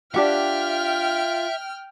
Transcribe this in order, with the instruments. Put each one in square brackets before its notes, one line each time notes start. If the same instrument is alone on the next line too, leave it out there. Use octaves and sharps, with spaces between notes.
[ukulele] D4 G4 F#5 [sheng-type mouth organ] F4 [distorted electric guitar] E5 [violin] G5 F6